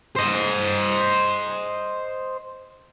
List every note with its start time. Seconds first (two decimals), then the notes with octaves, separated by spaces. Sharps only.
0.16 C5 D#5